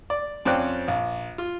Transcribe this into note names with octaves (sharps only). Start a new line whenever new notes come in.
D5
F2 C4 C#4 D5 G5 F#6
A#1
F4